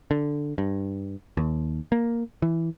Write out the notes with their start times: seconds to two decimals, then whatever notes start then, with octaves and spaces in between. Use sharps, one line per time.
0.11 D3
0.58 G2
1.37 D#2
1.92 A#3
2.42 E3